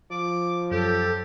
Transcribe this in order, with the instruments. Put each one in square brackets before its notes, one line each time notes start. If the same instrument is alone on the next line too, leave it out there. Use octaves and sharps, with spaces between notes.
[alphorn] F3 [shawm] D6
[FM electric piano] F#2 [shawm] G4 [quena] A4